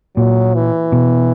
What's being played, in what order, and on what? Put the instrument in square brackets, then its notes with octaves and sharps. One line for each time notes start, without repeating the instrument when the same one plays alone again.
[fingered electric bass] A#2 [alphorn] F#3
[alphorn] E3
[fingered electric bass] B2